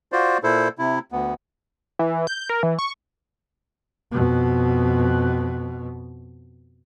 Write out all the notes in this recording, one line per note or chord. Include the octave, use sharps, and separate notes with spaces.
F4 F#4 C5 D5
A#2 E4 A4 C5
C3 E4
D2 B3
E3
G6
A#4
E3
C#6
F2 B2